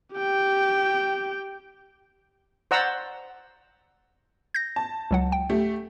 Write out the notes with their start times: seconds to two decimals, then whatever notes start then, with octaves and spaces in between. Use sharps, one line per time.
0.14 G4 G5
2.71 C5 D5 F#5 A#5 E6
4.54 G6 A#6
4.76 A5
5.11 C#2 F#3 F#5
5.32 G5
5.50 A3 G4